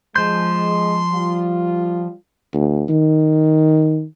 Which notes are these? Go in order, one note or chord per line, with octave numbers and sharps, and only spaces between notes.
F3 G#3 C6 G6
G3 F4
D2
D#3